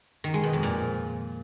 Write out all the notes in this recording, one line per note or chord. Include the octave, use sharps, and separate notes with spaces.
D#3
G#3
B2
F2
A#2